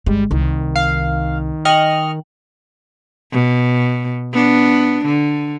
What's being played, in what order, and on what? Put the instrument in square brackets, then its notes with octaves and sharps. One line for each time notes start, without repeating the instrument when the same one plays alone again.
[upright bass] G1 G#3 [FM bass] G3
[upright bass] C2 [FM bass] D#3
[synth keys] F5
[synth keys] D#5 C#6 F6 [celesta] G5 F#7
[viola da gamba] B2
B3 D4
D3